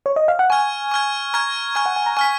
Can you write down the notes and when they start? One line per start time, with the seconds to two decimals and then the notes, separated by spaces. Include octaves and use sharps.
0.06 C#5
0.16 D#5
0.28 F5
0.39 F#5
0.50 G#5 C#6 F6 G#6
0.92 C#6 F6 G#6
1.34 A#5 C#6 F6 G#6
1.75 G#5 C#6 F6 G#6
1.86 F#5
1.96 G#5
2.06 A#5
2.17 G#5 C#6 F6 B6